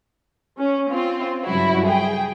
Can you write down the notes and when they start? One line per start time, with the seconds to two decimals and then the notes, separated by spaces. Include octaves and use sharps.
0.58 C#4
0.90 C4 F4
1.43 G2 C#3 F#3 E4 F#4
1.87 G#4 G5